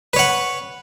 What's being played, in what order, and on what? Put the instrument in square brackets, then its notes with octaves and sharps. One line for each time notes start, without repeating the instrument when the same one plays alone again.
[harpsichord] B4
C#5
F#5